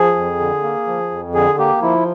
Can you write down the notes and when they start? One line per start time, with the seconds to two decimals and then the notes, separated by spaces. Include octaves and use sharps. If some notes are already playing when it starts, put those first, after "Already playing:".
Already playing: F3 G#4
0.16 F2
0.40 D3
0.63 A#3
0.87 F3
1.11 F2
1.34 D3 G#4
1.58 A#3 G4
1.82 F3 E4